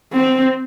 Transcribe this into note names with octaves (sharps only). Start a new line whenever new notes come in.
C4